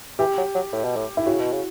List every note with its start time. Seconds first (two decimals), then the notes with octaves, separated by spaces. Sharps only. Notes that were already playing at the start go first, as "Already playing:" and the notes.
0.19 E3 G4
0.37 F#3
0.55 F#3
0.73 A2
0.84 B2
0.96 A2
1.17 E4
1.26 C#3 F#4
1.40 B2
1.53 C#3